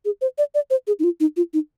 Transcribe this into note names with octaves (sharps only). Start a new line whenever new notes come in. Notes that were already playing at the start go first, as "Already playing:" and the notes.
G#4
C5
D5
D5
C5
G#4
D#4
F4
D#4
F4
D#4